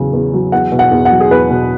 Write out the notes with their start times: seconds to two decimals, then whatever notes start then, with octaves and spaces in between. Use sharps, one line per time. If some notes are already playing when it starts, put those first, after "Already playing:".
Already playing: E2 C#3 F#3
0.13 E2
0.33 F#3
0.52 E2 F#5
0.72 B2
0.79 F#5
0.91 E2
1.05 F#5
1.11 F#3
1.20 G#4
1.30 E2 B4
1.50 B2